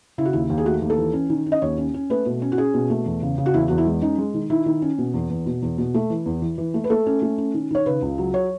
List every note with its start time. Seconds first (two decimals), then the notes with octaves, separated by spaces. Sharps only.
0.18 C#3 E4
0.25 F#4
0.33 D#2 E4
0.50 D#2
0.58 G#4
0.65 A3 F#4
0.82 D#2
0.90 A4
0.98 E3
1.13 C#4
1.30 D#3
1.46 C#4
1.52 D#5
1.62 D#2 C#5
1.78 C#4
1.94 C#4
2.10 A3 B4
2.26 B2
2.42 C#4
2.52 F#4
2.58 C#4 G#4
2.74 B2
2.90 A3
3.06 E2
3.22 C#3
3.38 C#3
3.46 F#4
3.54 E2 E4
3.68 E2 F#4
3.78 E4
3.86 G#3
4.01 C#4 D#4
4.18 G#3
4.34 D#3
4.50 D#3 E4
4.66 D#3
4.82 C#4
4.98 B2
5.14 E2
5.30 E2
5.46 B2
5.62 E2
5.78 B2
5.94 A3
6.10 E3
6.26 E2
6.42 E3
6.58 E3
6.74 A3
6.84 B4
6.90 A3 A4
7.06 C#4
7.22 A3
7.38 C#4
7.54 D#3
7.71 D#3 C#5
7.86 C#3 B4
8.02 C#2
8.18 F#3
8.34 C#5